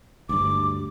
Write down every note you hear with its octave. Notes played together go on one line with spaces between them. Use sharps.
D2 G2 D6